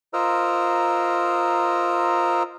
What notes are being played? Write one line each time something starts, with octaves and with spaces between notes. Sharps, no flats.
F4 A#4 C5 D#5 A#5 E6